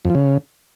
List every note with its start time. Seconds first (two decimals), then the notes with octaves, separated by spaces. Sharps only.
0.05 F2
0.10 F3
0.15 C#3